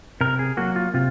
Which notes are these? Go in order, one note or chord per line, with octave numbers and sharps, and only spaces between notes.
C3 A#4
G#4
F#3 A#3 F#4
F4
C3 F4